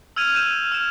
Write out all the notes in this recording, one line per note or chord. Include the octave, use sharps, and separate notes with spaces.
E6 F6 G#6 D#7 F7
G6 D#7 E7
F6 E7